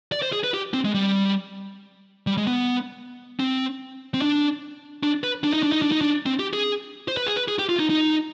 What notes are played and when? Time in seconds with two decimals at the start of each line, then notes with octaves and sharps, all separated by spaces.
0.12 D5
0.22 C5
0.32 G#4
0.44 B4
0.54 G4
0.74 C4
0.85 G#3
0.94 G3
2.27 G3
2.37 G#3
2.47 B3
3.40 C4
4.14 C4
4.22 D4
5.03 D4
5.24 B4
5.44 D4
5.53 D#4
5.63 D4
5.72 D#4
5.82 D4
5.92 D#4
6.01 D4
6.26 C4
6.40 G4
6.53 G#4
7.08 C5
7.17 B4
7.26 G#4
7.36 B4
7.48 G#4
7.59 G4
7.69 F4
7.80 D#4
7.90 D#4